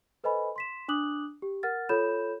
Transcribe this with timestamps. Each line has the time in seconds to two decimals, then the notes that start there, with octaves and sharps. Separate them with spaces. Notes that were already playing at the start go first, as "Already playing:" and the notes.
0.24 A4 B4 C5 D#5 G#5 B5
0.56 C6 B6 E7
0.88 D4 D6 D#6 F#6 F#7
1.42 G4
1.63 A#4 F#5 F6 A6
1.89 F4 A4 C#5 B5 G6 E7